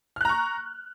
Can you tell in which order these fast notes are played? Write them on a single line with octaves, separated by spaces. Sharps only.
F6 F#6 A#5 C#6